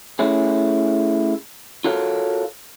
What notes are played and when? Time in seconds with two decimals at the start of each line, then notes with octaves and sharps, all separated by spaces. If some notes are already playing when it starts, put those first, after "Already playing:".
0.19 A3 C#4 E4 G#4
1.84 F4 F#4 A4 A#4 C#5 F5